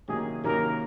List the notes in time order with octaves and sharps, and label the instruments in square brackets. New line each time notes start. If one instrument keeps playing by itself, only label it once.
[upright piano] C3 D#3 F#3 A#3 C#4 [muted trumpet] G#4
[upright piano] C3 D#3 F#3 A#3 C#4 [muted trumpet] A#4